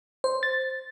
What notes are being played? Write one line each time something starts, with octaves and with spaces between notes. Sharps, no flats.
C5
A6